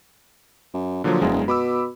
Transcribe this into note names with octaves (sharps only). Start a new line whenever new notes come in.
F#2
A#2 D3 F3 F#3
E1 F#2 G#3
B2 B5 D6 E6